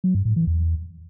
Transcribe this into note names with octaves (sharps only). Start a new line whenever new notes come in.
F#3
G2
A2
E3
E2